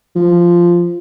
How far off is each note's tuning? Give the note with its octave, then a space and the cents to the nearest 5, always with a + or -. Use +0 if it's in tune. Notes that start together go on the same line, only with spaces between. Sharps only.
F3 -10